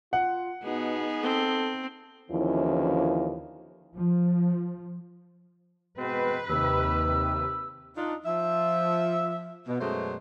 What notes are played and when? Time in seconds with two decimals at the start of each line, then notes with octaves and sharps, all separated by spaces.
0.13 F4 F#5
0.64 B2 B3 D#4 G#4
1.23 C4 A4
2.31 D#2 D3 E3 F3 C#4 E4
3.97 F3
5.98 B2 G#3 C4 B4
6.49 D#2 C3 D#4 G4 E6
7.97 D4 D#4 F4
8.25 F3 E5
9.68 B2
9.81 F#2 B2 F#3 G#3 A3 C5